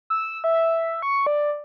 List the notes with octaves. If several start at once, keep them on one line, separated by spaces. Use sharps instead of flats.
E6
E5
C#6
D5